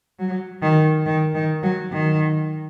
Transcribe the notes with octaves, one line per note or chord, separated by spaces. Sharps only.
F#3
D#3
D#3
D#3
F#3
D#3